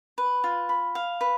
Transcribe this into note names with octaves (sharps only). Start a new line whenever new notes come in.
B4
F4
B5
F5
B4